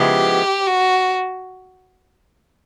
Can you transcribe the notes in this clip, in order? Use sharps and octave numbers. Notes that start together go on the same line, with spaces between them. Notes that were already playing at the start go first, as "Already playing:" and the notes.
Already playing: C#3 F3 G#3 B3 E4 G4
F#4